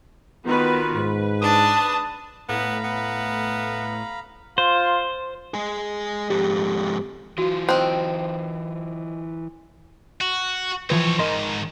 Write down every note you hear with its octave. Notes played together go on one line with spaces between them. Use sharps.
D#3 B3 F4 F#4 B4
G#2 B4
D4 A5 D#6
A2 B3 F5 A#5 B5
B3
F4 C5
G#3 G#4
F2 G#2 G4
E3 F4 F#4
D#3 C4 C5
F#4
E3 F3 C4 B4 C#5
G#2 D#3 A#4 D#5 C6